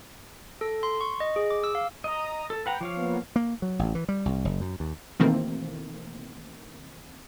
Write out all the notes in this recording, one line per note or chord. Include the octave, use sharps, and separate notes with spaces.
A4
C6
C#6
D#5
G#4
D6
E6
F5
D#5 A#5 D#6
A4
B4 F#5 G5 A#5
F3 C#5 F5 D6
A#3 B3
A#3
F#3
A1
E3
G3
C2
F#1
F#2
D#2
B2 D#3 E3 A3 A#3 C4